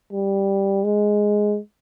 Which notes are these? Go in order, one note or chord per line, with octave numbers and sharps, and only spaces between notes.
G3
G#3